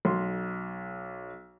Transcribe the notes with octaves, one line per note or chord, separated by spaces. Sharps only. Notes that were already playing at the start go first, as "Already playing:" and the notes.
B1 C6